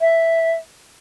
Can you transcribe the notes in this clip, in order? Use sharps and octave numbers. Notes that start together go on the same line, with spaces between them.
E5